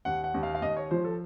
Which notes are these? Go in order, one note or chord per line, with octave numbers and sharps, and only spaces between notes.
D#2 F#5
F#5
D#2
F5
F5
D#2 D#5
C#5
F3 C5
A4